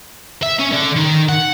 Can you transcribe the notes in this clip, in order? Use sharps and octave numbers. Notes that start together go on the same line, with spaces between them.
E5
C#4
D3
D#3
F#5